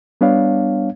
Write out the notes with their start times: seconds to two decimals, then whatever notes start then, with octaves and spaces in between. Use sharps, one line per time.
0.21 G3 B3 D4 C#5 F5